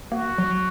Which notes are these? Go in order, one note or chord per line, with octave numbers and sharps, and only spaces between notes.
A#3 F#4
F#3